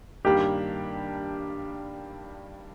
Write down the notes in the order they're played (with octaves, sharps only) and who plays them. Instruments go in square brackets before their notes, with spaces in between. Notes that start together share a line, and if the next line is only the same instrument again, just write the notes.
[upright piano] G2 D#3 G3 A#3 D4 [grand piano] G4